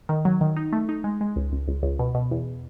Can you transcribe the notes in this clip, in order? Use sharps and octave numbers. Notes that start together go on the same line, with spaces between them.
D#3
F#3
D#3
D#4
A3
D#4
G#3
G#3
C#2
C#2
C#2
C#2
B2
B2
E2